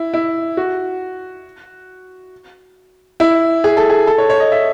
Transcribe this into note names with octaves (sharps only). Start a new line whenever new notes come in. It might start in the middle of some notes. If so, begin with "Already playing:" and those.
Already playing: E4
E4
F#4
E4
G#4
A4
G#4
A4
C#5
C#5
D#5
E5